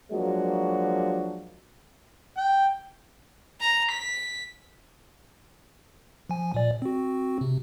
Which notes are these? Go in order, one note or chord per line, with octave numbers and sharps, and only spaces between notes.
F3 F#3 G#3 A#3 D4 F#4
G5
A#5
B6
F3 G#5
A#2 D5
C4 F#4
C3